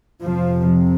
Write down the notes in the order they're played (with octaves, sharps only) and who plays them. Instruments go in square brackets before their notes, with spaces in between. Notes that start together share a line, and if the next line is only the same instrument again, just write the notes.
[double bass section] F2 C3 F3